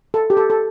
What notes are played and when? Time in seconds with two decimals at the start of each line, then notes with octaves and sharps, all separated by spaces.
0.14 A4
0.30 G4
0.37 A4
0.50 A4